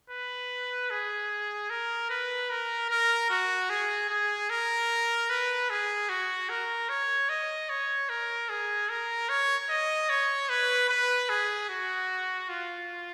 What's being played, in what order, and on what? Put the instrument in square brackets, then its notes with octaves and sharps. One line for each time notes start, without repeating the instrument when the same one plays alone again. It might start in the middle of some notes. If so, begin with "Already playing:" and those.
[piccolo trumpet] B4
G#4
A#4
B4
A#4
A#4
F#4
G#4
G#4
A#4
B4
G#4
F#4
A#4
C#5
D#5
C#5
A#4
G#4
A#4
C#5
D#5
C#5
B4
B4
G#4
F#4
F4